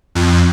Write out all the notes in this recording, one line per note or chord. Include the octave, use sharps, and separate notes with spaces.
F2